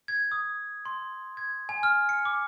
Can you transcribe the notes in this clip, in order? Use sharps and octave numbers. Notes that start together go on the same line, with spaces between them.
G#6
D#6
C6
G#6
G#5
F6
C#7
D6